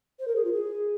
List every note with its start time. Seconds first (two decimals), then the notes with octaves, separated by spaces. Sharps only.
0.20 C5
0.28 A#4
0.36 G#4
0.44 F4
0.52 G#4